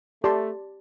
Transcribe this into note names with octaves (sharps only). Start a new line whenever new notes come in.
A3 G4 D5 A5 C6